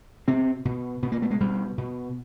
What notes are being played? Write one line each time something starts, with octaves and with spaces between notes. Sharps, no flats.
B2 C4
B2
B2 B3
A#3
A3
G#3
B2 G3
B2